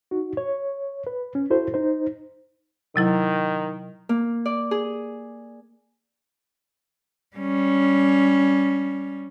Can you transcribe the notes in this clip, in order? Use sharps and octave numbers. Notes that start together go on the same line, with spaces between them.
D#4 F#4
C#5
B4
C#4
E4 F#4 A4 C5
D#4 C5
C3 D#3 F#3 E4
A#3
D5
G#4
G3 C#4